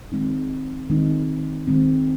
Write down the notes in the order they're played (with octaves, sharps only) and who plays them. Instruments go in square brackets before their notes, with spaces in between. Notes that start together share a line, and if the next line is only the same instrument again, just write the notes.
[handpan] D#3 G#3 C4 D#4
D#3 G#3 C4 D#4
D#3 G#3 C4